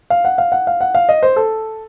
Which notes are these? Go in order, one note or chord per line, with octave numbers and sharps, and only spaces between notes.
F5
F#5
F5
F#5
F5
F#5
F5
D#5
C5
A4